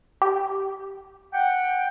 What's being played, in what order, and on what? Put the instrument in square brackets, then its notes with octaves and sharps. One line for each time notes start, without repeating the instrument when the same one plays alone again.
[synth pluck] G4
[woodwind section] F#5 G5